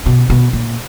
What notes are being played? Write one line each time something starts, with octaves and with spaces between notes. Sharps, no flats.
B2
B2
A#2